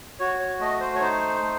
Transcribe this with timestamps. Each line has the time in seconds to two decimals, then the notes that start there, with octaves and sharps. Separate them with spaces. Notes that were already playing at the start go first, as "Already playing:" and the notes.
0.20 F#4 C#5
0.40 C#5
0.60 A3 D#5
0.80 C5
0.96 C#5
1.01 D#4 C5
1.42 A3